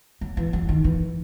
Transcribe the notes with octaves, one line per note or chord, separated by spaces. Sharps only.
F#3
E3
F#3
D#3
E3